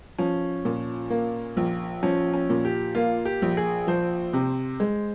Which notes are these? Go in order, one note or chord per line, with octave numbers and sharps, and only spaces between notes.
F3 C#4
A#2
A#3
A#1
F3 C#4
C#4
A#2
G4
A#3 F4
G4
A#1
G#4
F3 C5
C3
G#3